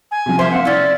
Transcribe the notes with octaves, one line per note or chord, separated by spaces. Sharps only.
G#5
C3 F3
A#3 C5 E5
C4 F5 F#5
C#4 E4 D5